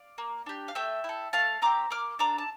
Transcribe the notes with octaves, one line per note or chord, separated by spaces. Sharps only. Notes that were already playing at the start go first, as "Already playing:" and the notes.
Already playing: D5 F5
A#3
D4 G4
F5
A3 E5 G5
E4 A4
A3 F5 A5
C4 G4 A#5 D6
A#3 D6 F6
D4 A4 A#5 D6
A5